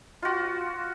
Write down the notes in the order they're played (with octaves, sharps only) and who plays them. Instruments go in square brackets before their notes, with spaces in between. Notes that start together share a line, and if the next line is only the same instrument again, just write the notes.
[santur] F4 F#4